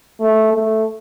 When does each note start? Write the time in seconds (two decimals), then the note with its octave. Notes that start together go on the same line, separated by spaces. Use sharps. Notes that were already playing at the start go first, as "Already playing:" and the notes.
0.20 A3
0.54 A3